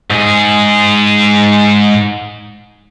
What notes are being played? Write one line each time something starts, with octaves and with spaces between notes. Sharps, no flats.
G#2 G#4